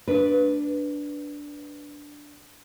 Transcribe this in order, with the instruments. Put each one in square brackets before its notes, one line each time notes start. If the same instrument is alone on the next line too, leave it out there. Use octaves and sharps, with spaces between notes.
[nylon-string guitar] D4 B4